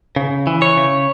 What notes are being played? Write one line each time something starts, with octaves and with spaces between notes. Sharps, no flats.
C#3
E3
C#5
C#3